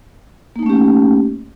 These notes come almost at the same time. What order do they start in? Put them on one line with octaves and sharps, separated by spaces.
A#3 D#4 A3 C#4 G4